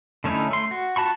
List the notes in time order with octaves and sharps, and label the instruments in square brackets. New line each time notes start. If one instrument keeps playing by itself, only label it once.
[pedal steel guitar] D3 A3 C#4 D#4 E4
A3 C6
F#4
F4 F#4 A5 B5 C#6